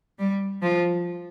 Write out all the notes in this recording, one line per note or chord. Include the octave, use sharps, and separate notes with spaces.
G3
F3